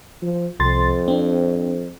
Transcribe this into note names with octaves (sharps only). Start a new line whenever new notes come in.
F3
C2 F2 C6 A6
C4 D4